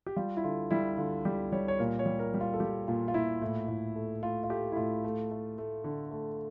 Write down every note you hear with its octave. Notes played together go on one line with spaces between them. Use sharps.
G4
G3 F4
E4
D3 F4
G3 E4
D3 F4
G3 G4
G3 C#5
C#5
A#2 A#4
C#5
G3
A#4
G3
F4
A4
G3 G4
A#2 F4
F4
A#2 E4
A2
A2
A3
A3 F4
F4
A3 G4
E4
A2 F4
A3
A3
A3
D3
A3